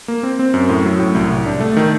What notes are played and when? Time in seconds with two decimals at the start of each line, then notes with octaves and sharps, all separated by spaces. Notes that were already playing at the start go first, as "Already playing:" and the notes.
0.08 A#3
0.23 C4
0.39 C4
0.54 F#2
0.69 A2
0.85 F#3
1.00 A2
1.15 C2
1.30 C2
1.46 D4
1.60 A3
1.77 D#3